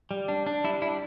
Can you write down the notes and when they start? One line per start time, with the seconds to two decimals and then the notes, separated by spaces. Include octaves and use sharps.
0.11 G3
0.28 D4
0.46 D4
0.64 G3 E4
0.82 D4 E4